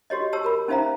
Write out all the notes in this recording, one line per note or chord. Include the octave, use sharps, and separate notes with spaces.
F#4 G4 C#5 D#5
G4 C#5 A5 E6
A#4 B5
C#4 D#4 C5 E5 F5 A#5